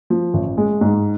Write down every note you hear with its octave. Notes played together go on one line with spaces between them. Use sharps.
F3
A1
G#3
G#2